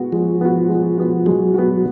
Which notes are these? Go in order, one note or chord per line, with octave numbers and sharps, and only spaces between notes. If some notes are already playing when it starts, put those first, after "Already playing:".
Already playing: G#3 B3 F#4
F3 G#3
B3 F#4
G#3
B3 F#4
F#3 G#3
B3 F#4